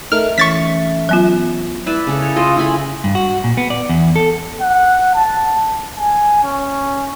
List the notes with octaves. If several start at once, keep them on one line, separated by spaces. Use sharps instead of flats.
A3 D#4 A4 A#4 F6
E3 C#4 C#6 A6 B6
F#3 B3 F4
E4 B4 D5 E5
C#3 A4
C#5
F4 A4 D#5
E4 F4 G#5 B5
G2
F#4
A#2
B3
D5
E2
A4
F#5
A5
G#5
C#4